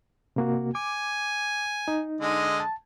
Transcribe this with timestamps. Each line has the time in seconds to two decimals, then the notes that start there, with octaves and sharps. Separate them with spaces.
0.36 C3 A#3 F#4
0.75 G#5 D6
1.88 D#4
2.21 D3 G#3 D#5
2.60 A5